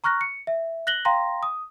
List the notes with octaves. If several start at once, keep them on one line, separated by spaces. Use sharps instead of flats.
A#5 C#6 F6 F#6 A#6
C#7
E5
F#6 A#6 F#7 G7
F5 G5 A#5 C6 A#6
D#6